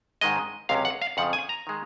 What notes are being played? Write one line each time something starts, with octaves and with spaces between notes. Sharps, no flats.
G#2 D#3 G#3 D#5
C#2 C3 F#3 C#4 F5
F#5
F5
F2 C#3 F3 F#5
G#5
A#5
D#3 G#3